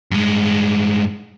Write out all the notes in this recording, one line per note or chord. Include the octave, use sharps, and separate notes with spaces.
G2 G#3